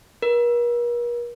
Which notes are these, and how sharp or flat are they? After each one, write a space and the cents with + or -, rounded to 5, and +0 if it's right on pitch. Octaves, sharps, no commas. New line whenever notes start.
A#4 +45